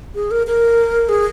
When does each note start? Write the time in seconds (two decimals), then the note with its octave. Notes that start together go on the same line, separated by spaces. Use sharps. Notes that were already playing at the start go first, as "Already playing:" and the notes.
0.15 G#4
0.31 A#4
0.47 A#4
1.09 G#4